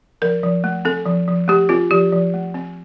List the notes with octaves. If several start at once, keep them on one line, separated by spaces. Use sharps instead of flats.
F3 A#4
F3
A3
C4 A4
F3
F3
A3 G4
C4 F4
F3 G4
F3
A3
C4